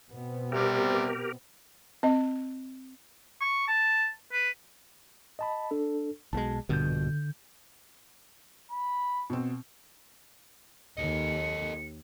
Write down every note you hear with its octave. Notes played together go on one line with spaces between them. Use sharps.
B2 B3 C4
C3 G3 G4 A#4
C4 D#5
C#6
A5
B4
D#5 A5 B5
D4 A4
B1 B2 G#3 A5
A#1 G2 B2 D3 G6
B5
B2 C4
D#2 A4 D#5 C#7